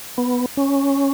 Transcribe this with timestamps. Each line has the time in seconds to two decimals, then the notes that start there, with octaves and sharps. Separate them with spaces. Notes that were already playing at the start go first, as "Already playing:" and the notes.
0.18 B3
0.57 C#4